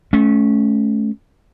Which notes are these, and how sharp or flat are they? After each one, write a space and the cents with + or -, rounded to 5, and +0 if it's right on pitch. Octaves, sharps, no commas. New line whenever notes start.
A3 -30 C#4 +0